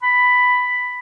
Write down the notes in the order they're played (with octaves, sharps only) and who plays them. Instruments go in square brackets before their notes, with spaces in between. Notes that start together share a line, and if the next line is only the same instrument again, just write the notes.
[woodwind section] B5